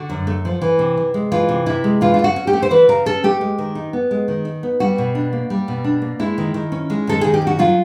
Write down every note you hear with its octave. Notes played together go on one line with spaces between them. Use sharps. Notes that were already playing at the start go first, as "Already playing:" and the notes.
Already playing: D3 F#4
F#2
A3
F3
E3
C3
C3
G#3
E3 F4
C3
C3 E4
G#3
E3 F4
F4
C#3
F#4
C#4
G4
A3
C5
E3 B4
C#3 A#4
C#4 A4
A3 G4
G#3
D#3
D#4
B3
G#3
D#3
D#4
B3
G3 F#4
B2
D4
A#3
G3
B2
D4
A#3
G#3 E4
D#3
D#3
C#4
G#3
D#3 A4
D#3 G#4
G4
C#4
F#4
F#3 F4